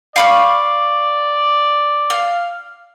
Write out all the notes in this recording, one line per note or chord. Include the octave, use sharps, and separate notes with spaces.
D5 F5 B5 C#6
F5